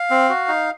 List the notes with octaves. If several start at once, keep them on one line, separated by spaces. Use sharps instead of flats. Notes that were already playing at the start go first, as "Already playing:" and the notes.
Already playing: F5
C4
F#4
D#4